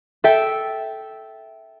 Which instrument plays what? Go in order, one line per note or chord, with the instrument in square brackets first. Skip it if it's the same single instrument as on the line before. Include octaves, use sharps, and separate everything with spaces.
[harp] A4 E5 G5